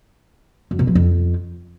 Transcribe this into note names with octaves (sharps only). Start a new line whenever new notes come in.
F#2
B2
F3
F2